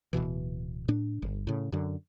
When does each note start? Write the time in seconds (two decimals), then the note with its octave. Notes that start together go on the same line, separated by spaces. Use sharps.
0.13 D1 G1 B2 E3
0.88 A2 D4
1.22 G1
1.47 A2 C#3
1.72 F#2 D3